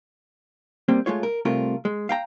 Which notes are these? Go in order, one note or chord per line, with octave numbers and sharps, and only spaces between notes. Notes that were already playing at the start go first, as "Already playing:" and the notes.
G3 A#3 C4
G#3 A3 F4 C#5
A#4
C2 C3 A3 F4 A#4
G#3
F5 G5 A#5